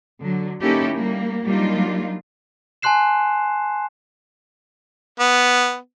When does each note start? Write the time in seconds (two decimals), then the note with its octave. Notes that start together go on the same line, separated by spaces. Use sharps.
0.21 D3 F#3
0.62 A#3 C#4 D#4 E4 G4 A4
0.95 G3 A#3
1.46 F#3 G3 A#3 D4 D#4 F4
2.82 G#5 A5 C6 F#6 C7 E7
5.20 B3